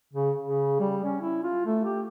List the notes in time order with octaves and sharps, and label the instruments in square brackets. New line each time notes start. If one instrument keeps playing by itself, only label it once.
[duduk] C#3
C#3
G3
C#4
E4
F4
A3
G4